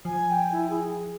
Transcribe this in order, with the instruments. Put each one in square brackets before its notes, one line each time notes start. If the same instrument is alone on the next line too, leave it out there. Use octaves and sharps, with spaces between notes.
[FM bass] F3 [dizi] G#5
[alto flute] G5
E4
G#4